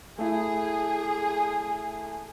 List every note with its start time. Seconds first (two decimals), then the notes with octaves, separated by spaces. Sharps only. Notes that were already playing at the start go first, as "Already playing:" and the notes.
0.19 A3 E4 G#4